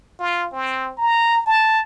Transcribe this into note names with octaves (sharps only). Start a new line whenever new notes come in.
F4
C4
A#5
A5